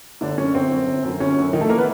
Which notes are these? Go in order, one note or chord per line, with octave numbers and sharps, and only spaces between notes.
G1 D3 D4
F#2 D3 C#4
G1 C4
F#2 D3
G1
F#2 D3
G1 C#4
F#2 D3
A#1 D#3 D#4
A3 A4
E3 A#3 A#4
B3 B4